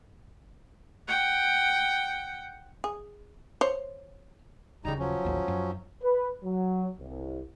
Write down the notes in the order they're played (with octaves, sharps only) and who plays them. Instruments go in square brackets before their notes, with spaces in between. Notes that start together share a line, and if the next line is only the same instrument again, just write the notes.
[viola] F#5 G5
[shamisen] G#4
C5 C#5
[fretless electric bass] D#1 C#3 [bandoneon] G3 D#4 A#5
[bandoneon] F3 F#3 C#4
[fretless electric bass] A1 D#2
F#2
[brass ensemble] B4
F#3
C2